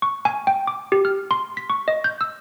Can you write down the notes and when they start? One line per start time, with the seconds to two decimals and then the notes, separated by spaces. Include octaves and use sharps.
0.02 C#6
0.25 G#5
0.47 G5
0.67 D6
0.92 G4
1.05 F6
1.31 C6
1.57 B6
1.70 C#6
1.88 D#5
2.04 G6
2.21 E6